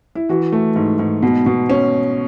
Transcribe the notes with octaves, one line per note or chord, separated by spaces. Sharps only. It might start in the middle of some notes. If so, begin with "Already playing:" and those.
E4
E3 F#4
A3
G#2
G#2
B2
B2
C#4